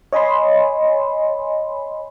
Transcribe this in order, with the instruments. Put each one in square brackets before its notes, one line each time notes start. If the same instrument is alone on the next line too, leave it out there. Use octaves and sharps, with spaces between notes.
[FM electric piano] C#5 D#5 G#5 B5 C6